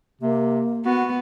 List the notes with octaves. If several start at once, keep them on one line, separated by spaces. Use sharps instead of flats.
C3 A#3
B3 F#4